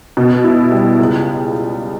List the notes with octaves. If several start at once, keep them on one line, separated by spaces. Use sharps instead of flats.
B2
E4
G3
C#2